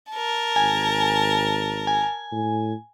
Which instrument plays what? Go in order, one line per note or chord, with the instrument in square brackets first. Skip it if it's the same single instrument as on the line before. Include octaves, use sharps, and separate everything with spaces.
[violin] A#4 A5
[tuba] G#1 [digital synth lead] G#5
[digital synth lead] G#5
[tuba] A2